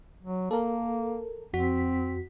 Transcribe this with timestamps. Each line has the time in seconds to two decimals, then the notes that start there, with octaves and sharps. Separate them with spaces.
0.23 F#3
0.51 A#3 A4 A#4
1.53 F2 C4 F#4 B6